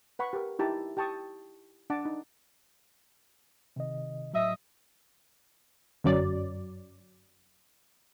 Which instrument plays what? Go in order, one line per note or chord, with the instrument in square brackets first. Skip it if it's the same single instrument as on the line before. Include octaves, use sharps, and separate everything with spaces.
[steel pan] B4 F#5 B5 C#6
G4 A#4
D#4 E4 G4 A5 A#5
G4 G5 A5 C#6 D#6
D4 F#5 A5 D6
D#4
[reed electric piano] C3 D#3 D#5
[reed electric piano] A2 F#3 [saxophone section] D#5 E5
[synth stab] G1 F#2 F#3 D5